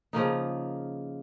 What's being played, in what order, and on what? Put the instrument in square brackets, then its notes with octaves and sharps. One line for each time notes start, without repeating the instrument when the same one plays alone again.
[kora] C#3 F3 A#3 D#4